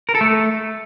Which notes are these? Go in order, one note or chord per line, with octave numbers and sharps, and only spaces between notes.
A#4
A4
A3